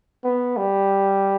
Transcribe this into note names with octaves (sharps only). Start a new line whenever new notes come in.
B3
G3